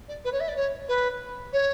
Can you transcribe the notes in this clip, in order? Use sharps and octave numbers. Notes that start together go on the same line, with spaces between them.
D5
B4
C#5
E5
D5
C#5
B4
C#5